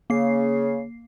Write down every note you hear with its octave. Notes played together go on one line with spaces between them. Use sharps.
C#3 A#3 C7